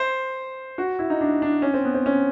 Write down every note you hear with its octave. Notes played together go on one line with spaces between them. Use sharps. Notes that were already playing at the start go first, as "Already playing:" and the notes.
Already playing: C5
F#4
E4
D#4
D4
D4
C#4
C4
B3
C4
C#4